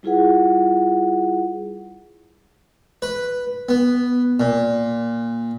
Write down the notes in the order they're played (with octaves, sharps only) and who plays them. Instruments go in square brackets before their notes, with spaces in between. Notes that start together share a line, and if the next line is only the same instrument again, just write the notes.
[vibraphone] G3 E4 F4 G#4 B4 F#5
[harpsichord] B4
B3
A#2